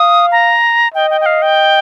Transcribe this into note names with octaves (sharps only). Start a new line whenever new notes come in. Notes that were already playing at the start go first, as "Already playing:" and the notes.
Already playing: F5 D#6
A#5
D#5 G5
G5
G5
F5
G5